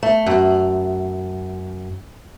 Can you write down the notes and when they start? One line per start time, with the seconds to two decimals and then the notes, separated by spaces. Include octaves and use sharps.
0.03 A3
0.26 F#2